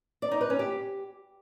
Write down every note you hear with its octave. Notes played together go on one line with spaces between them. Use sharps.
D5
D#4
B4
C#4
G4